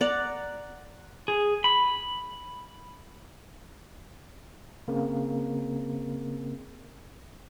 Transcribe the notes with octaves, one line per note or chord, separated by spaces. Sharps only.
D5 F#5 A#5
G#4
B5
C#3 A#3 C4 A#4